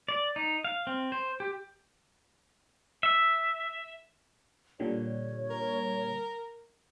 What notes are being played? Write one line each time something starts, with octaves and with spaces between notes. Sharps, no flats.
D5
D#4
F5
C4
C5
G4
E5
A#2 D3 G3 C#5
A#4